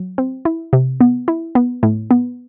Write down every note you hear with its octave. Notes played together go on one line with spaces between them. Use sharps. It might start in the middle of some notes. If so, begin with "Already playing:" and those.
Already playing: F#3
C4
E4
C3
B3
E4
B3
A2
B3